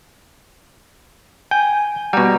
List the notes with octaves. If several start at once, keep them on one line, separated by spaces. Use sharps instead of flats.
G5 G#5
B2 G3 F#5 A#5